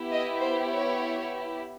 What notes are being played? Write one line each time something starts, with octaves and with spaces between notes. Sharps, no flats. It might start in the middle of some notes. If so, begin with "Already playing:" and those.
Already playing: B3 E4 G4
D#5
C5
C#5